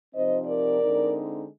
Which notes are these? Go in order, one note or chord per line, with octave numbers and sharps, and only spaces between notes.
C3 F3 C4 D#4 C5 D#5
A#4 D5
D3 G#3 C4 D#4